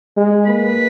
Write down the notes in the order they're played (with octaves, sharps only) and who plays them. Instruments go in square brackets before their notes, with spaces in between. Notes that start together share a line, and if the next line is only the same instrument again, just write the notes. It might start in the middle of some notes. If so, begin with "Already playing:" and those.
[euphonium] G#3
[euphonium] A#3 [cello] B4